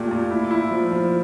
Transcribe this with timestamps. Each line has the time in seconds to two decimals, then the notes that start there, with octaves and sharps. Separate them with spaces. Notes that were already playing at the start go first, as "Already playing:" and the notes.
Already playing: A#2 A3 G4
0.11 A#2
0.31 E4
0.51 E4
0.71 F3
0.91 F3